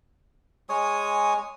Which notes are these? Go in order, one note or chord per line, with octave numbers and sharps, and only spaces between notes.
G#3 C#5 G#5 D#6